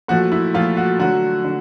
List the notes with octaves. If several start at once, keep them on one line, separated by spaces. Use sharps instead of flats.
A#2 F3 A3 F#4
E4
A#2 F3 A3 F4
F#4
D3 F#3 A3 F#4
D3